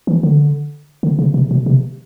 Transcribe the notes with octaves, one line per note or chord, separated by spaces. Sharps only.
E3
D3
D3
C#3
C3
B2
C3